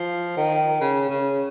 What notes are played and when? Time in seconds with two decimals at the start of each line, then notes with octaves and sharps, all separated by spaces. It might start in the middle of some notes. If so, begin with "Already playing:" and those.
Already playing: F3
0.37 D#3
0.81 C#3
1.09 C#3